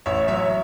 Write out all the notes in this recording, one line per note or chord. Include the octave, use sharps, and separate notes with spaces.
A1 C#5 E5
F#3 C#5 E5